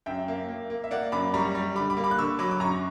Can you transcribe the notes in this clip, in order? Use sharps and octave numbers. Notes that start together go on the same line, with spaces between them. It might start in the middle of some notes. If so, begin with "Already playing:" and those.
F#2 E5 G5
A#3
A#3
A#3
E5
A#3 D5 F#5
F#2 B5 D6
G3 A#5 C#6
G3
D3 B5 D6
B5 D6
A#3
B5 D6
F#6
D3 C#6 E6
F#3 B5 D6
D6
F#2 A#5 C#6